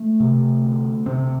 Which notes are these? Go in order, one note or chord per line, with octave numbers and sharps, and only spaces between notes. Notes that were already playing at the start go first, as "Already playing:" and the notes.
Already playing: A3
C3
D2
C3 C4